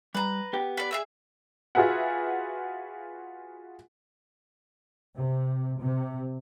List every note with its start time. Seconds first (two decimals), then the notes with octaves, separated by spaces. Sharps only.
0.15 G3 B4 A#5
0.53 B3 G4 G5
0.77 B4 D5
0.91 G#4 E5 E6
1.75 F4 F#4 G#4 B4 E5 F#5
5.15 C3
5.80 C3